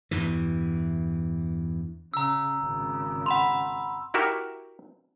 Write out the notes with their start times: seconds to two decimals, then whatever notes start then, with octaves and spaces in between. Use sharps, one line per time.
0.11 E2 G2 E3
2.14 C#3 A#5 E6
2.60 G#1 C#3
3.26 F#5 B5 C6
4.14 E4 F#4 G4 A#4 E5